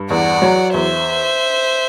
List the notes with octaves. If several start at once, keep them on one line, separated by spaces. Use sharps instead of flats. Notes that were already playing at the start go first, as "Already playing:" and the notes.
Already playing: G2
E2 D5 F#5
F#3
E2 C5 E5